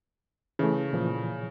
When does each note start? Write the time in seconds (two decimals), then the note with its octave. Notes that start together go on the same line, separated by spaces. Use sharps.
0.59 C#3 E3 A3
0.93 A#2 E3 F3